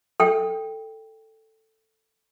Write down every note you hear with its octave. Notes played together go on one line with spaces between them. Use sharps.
A4 G5